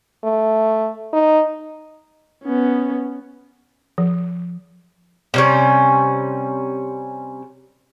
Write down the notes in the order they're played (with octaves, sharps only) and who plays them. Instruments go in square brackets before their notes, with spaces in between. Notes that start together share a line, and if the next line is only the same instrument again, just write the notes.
[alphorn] A3
D#4
[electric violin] B3 C#4
[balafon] F3
[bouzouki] C3 G3 C#4